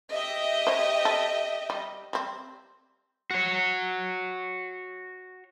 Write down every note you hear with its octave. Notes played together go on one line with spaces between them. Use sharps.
G4 D#5 E5
C5 C#5
A4
G3
G3 C4
F#4 C#5